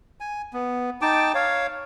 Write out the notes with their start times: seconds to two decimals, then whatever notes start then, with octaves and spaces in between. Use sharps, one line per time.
0.20 G#5
0.53 B3
1.02 D#4 G5 A5 D6
1.35 C#5 F5